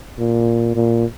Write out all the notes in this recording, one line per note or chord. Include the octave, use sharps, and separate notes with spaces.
A#2
A#2